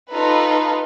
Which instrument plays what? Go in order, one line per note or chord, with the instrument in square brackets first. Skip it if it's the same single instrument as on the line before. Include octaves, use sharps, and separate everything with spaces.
[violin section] D#4 F4 A4 B4